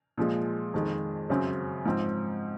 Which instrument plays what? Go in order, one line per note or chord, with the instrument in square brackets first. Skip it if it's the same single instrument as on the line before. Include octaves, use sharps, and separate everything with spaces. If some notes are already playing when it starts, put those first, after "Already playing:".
[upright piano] A#2 F3 G#3
F2 D#3 G#3
F#2 C#3 F#3 C4
G#2 F3 C4